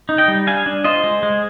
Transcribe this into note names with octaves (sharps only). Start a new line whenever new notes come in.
D#4
D#5 G5
G3
D4 F5 G#5
D4
F4 C5 D#5
G#3
G#3